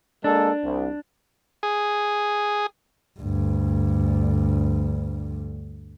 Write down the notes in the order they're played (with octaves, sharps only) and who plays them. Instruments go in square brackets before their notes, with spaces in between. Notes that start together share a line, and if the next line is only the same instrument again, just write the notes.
[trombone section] G#3 A#3 A4 [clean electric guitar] D4
[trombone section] C2
[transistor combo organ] G#4
[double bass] D2 G2